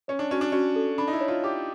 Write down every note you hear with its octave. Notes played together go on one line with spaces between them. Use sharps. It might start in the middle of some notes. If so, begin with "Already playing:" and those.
C#4 C#5
D4
C#4 F#4
D4
C#4 F#4
A4
D4 B5
D#4
E4
C#5
F4
G4 D6